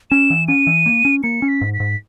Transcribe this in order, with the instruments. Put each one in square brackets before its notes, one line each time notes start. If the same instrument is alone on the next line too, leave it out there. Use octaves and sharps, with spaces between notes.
[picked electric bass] C#4 [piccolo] E7
[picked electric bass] E3
[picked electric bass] C#4 [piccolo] D#7
[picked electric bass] E3
A#3
C#4
[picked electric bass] A#3 [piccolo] C#7
[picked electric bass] C#4
[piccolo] B6
[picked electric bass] G#2
[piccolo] B6
[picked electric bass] G#2